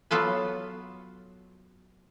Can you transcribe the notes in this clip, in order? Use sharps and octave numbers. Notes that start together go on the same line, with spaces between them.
F#3 B3 F4 A4 B4